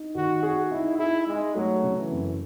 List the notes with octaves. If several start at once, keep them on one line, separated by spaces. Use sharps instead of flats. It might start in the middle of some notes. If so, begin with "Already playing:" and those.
Already playing: D#4
D#3 F#4
F#4 G#4
D#4 E4
E4 G#4
G#3 D#4
F#3 A3
C#3
E3
F#2